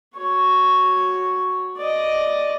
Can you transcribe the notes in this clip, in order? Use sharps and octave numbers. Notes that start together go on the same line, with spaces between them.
F#4 C#5
D5 D#5